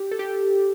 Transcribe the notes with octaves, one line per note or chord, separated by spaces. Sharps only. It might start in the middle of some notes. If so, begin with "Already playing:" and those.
Already playing: G4
A4
G4